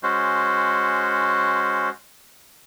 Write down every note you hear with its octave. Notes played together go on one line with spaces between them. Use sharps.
G#3 C#4 F#4 C5